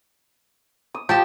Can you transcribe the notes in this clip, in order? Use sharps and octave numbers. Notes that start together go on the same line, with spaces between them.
D#6
F3 G4 G5 A5